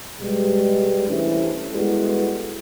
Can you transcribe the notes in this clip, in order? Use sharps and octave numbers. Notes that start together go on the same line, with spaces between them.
B2 G3 G#3
C3 E3 A3 C#4 D4
G3 G#3 B3 E4 F#4 A4